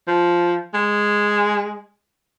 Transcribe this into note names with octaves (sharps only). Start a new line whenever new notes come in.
F3
G#3